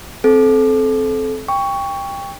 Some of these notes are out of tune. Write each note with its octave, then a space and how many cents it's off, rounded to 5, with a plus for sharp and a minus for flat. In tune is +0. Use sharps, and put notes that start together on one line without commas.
C4 +0 A4 -25
G5 +20 C#6 +15